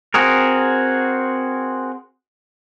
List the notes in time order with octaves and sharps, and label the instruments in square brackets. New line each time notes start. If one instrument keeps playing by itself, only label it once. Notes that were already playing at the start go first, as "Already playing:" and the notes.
[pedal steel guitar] C4 F#4 G#4 A#4